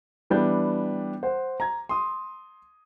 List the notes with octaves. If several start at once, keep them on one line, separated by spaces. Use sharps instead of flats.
E3 G3 B3 D4 G6
C5 F#5
A#5 G#6
C6 D#6